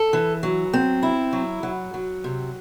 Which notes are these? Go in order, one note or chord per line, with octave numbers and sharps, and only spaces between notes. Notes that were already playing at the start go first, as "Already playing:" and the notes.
Already playing: A4
E3
F#3
C4
E4
F#3
F#3
F#3
C3